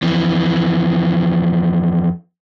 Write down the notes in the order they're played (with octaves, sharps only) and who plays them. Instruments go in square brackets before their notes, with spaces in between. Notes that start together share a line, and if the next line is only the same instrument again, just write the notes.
[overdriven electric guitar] F2 E3